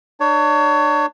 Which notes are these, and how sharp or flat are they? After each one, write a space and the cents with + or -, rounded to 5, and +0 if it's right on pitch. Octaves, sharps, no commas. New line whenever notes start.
D4 +35 C#5 +25